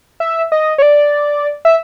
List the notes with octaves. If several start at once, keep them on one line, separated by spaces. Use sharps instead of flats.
E5
D#5
C#5
D5
E5